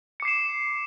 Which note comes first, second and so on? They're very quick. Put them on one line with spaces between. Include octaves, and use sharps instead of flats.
C#7 D6 C7 E7